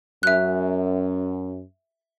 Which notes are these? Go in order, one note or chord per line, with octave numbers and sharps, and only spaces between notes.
F#2 E5 F#6